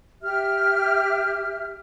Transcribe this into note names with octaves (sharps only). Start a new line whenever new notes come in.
G4 E5 F6